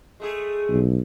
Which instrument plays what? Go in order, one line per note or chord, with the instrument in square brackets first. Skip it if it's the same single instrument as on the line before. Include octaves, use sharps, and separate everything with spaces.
[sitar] G#3 A3 G#4
[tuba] B1